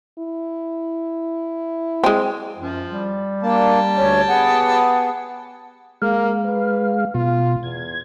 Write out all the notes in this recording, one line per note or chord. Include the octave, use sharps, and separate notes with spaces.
E4
G#3 C4
F#2 F3
G3
A#3 D4 G4 A5
D2 C#4 C#5
B3 G#4 F#5
G#3 A#3 F5
B4
B2 F4
E2 G#6